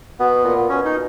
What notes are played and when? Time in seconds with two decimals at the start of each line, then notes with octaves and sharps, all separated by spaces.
0.20 B2 B3
0.44 A#2
0.69 B2 C#4
0.85 D#4